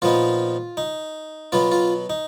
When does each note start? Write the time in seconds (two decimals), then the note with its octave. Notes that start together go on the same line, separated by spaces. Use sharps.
0.02 A#2 F3 B3 D#4 F4
0.77 D#4
1.52 B2 F#3 B3 F4
1.72 F4
2.10 D#4